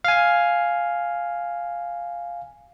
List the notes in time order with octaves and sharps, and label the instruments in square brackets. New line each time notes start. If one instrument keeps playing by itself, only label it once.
[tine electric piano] F5 G#5